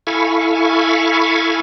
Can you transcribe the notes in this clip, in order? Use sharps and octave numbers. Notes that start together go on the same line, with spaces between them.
E4 A4 F5 G#5 B5 C#6